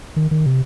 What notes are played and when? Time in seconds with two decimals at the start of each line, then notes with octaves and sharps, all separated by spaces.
0.16 D#3
0.31 D#3
0.46 C3